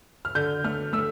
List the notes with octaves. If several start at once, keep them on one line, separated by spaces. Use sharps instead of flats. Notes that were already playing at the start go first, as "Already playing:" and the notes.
F6
D3 G6
A3 F6
A3 E6